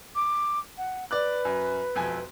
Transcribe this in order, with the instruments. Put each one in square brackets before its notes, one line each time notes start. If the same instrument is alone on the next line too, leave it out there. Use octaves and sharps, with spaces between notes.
[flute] D6
F#5
[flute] B4 [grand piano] D5 D6 F#6
[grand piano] F#2
E1 F2 G#5